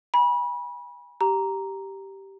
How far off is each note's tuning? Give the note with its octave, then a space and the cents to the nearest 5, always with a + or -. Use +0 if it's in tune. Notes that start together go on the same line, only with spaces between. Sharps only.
G#5 -25 B5 -30
G4 -10 A#5 +0